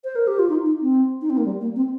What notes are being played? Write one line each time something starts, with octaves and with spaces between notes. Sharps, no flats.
C5
A#4
G4
F4
D#4
D#4
C4
D#4
C4
A#3
G3
A#3
C4